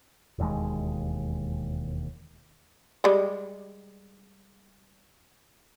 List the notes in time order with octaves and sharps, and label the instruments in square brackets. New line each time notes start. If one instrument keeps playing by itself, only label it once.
[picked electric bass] E1 D#2 G#3
[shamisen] G3 G#3